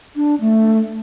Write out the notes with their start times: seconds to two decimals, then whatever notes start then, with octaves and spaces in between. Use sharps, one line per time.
0.16 D4
0.41 A3